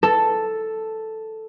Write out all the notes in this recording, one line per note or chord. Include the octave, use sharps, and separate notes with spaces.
A4